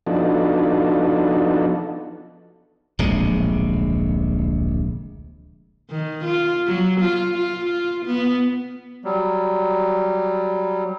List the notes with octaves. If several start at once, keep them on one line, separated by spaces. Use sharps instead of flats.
F3 B3 D4 D#4 F#4 A4
D1 A#1 C3 G#3
D#3
F4
F#3
F4
F4
F4
B3
F#3 G3